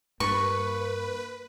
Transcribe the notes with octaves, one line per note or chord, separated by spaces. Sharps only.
G2 A#3 B4 C#6